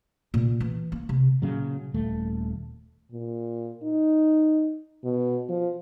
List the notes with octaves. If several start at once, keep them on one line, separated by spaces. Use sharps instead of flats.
A#2
E3
A#3
C3
A#2 C#3 F#3
D#1 A3
A#2
D#4
B2
F3